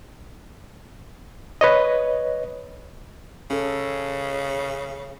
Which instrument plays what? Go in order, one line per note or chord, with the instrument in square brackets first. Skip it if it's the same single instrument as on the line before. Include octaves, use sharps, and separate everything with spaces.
[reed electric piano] B4 C#5 D#5
[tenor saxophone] C#3 [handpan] C#4 A4